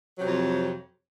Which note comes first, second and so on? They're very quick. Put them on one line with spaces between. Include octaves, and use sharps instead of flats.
F#3 C3 F2